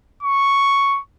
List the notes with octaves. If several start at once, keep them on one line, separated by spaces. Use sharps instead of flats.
C#6